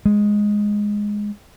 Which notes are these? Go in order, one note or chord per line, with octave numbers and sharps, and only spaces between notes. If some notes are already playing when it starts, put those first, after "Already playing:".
G#3